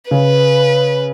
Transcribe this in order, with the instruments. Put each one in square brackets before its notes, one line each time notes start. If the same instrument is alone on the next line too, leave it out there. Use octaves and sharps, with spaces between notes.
[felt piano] C#3 [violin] B4